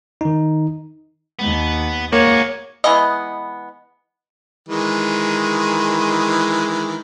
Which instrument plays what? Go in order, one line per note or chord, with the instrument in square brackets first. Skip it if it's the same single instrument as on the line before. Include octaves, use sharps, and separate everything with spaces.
[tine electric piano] D#3 D#4
[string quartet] D#2 [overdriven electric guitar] B3
[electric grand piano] A#3 [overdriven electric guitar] F#4 G#4 [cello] C#5
[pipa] E3 G#3 B3 D#5
[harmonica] D#3 E3 G#3